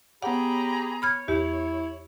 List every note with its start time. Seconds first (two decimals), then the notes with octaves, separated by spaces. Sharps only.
0.22 B3 G4 G#4 C#5 F#5 A#5 B5
1.02 C#5 B5 F6 G#6
1.28 E2 E4 G4